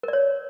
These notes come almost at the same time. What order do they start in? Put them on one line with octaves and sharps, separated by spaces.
A#4 D5 C#5